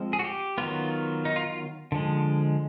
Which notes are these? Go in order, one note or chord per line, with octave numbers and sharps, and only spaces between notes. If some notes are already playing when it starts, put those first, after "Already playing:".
Already playing: F3 G#3 C4
G#4
F#4
G4
D#3 F#3 B3 F4
D#4
F4
F4
D3 F3 G#3